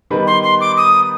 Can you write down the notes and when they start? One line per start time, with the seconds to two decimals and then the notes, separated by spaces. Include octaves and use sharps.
0.10 D#3 G3 B3 D#4 B4
0.27 C6
0.43 C6
0.61 D6
0.77 D#6